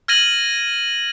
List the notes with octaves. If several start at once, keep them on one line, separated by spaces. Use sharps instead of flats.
F6 G#6 A#6 D#7 F#7